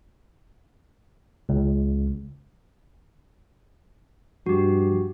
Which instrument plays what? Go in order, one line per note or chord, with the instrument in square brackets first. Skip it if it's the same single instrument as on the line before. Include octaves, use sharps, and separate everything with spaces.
[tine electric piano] C#2
[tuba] G2 [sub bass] F3 [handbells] F#4 G4